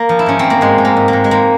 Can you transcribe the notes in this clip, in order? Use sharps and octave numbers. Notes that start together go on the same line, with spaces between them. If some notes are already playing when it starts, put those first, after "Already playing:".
Already playing: A#3
F3
E4
G#2 C#4
F3 C4
A#3
G#2 G#3
G#2
A#3
G#2
A#3
G#2
G#3
G#2 A#3